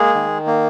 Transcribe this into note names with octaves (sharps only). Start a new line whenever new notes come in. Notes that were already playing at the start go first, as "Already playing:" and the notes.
Already playing: G#3 A#3 G#4
D#3
A#3